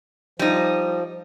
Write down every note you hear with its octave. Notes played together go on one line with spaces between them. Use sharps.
F3 G3 D#4